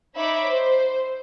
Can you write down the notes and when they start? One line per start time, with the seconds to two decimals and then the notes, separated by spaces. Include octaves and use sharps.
0.17 D#4 C#5 E5 B5 D6
0.48 C5